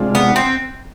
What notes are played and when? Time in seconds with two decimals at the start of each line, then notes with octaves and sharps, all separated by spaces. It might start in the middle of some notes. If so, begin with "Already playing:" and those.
Already playing: C3 G#3 D4 F4
0.15 B3
0.36 C4